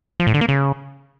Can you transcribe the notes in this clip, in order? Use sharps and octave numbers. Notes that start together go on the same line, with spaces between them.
F3
A2
D3
A#3
C#3